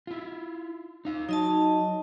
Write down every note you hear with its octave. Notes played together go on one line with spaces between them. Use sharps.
E4 F4
D#4 F5
F#3 D#4 D#5 A5